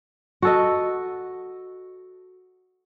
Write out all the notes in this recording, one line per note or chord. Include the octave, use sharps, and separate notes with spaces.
F#4 A4 D#5